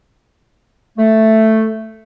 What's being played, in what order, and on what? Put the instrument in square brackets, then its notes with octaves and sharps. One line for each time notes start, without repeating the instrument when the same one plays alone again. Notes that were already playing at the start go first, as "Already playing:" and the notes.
[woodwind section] A3